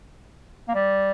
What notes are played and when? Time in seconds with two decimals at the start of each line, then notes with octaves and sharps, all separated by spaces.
0.68 A#3
0.74 G3